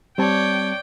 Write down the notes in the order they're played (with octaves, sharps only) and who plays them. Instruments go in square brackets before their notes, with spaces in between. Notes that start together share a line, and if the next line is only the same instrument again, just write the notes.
[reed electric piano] G3 C4 A5 [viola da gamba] C#5 D5 [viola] G5